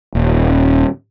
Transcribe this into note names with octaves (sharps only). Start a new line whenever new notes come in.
D#1